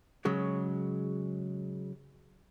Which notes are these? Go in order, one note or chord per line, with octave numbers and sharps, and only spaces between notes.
C#3 F#3 G#3